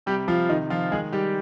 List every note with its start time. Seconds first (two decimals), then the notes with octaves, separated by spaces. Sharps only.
0.06 C3 G3 G4
0.28 F3 F4
0.49 C3 D#3 D#4
0.70 F3 F4
0.91 D#3 G#3 G#4
1.13 D#3 G3 G4